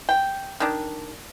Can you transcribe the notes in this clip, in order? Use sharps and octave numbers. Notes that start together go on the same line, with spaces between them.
G5
D#3 D4